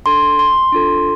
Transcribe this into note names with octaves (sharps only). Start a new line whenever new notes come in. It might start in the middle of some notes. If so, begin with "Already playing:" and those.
D4 A4 C6
C6
D4 F4 A4